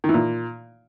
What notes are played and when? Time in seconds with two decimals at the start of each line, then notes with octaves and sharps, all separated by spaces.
0.04 D#3
0.09 E3
0.14 A#2